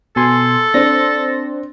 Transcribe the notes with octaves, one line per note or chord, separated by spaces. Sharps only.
B2 A4 G#5 C6
C4 D4 A#6